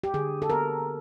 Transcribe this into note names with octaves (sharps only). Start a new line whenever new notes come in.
G4
D3 G#4
A4
B3 A#4